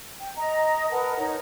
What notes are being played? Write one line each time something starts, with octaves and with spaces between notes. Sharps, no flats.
G5
D#5 A#5
A#4 B4 F#5 A5
D#4 C#5 A#5